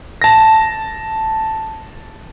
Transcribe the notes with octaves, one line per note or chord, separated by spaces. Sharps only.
A5 A#6